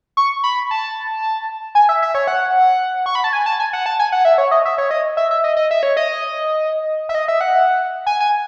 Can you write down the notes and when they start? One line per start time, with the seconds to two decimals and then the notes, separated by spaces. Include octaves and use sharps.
0.17 C#6
0.44 B5
0.71 A5
1.75 G#5
1.89 E5
2.02 E5
2.15 C#5
2.27 F#5
3.06 C#6
3.15 B5
3.24 A5
3.33 G#5
3.46 A5
3.60 G#5
3.73 F#5
3.86 A5
3.99 G#5
4.12 F#5
4.25 E5
4.38 C#5
4.51 D#5
4.65 E5
4.78 C#5
4.91 D#5
5.17 E5
5.31 E5
5.44 D#5
5.56 D#5
5.71 E5
5.83 C#5
5.97 D#5
7.09 E5
7.15 D#5
7.28 E5
7.41 F#5
8.06 G#5
8.20 G#5